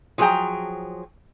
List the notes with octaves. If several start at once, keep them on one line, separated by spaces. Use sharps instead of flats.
F3 F#3 G#4 A#4 G5 A#5